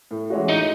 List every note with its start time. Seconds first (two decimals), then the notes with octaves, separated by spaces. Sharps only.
0.11 A2
0.30 E3 G#3 C#4 F#4
0.49 A2 D#4